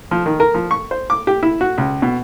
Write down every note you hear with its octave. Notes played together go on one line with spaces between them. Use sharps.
F3
D#3
A#4
F3
C#6
C5
D6
G4
E4
F#4
C#2
B2